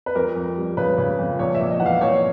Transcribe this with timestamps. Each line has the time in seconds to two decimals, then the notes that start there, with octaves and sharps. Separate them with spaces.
0.06 B4
0.15 F2 A#4
0.36 F2
0.57 G3
0.77 C#3 B4
0.98 C#3
1.18 F2
1.39 A#1 C#5
1.54 E5
1.60 A#1
1.71 D#5
1.80 E3 F#5
1.86 F5
2.01 A#1 C#5